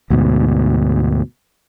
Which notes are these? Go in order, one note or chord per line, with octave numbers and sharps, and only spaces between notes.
D2 G#2 B2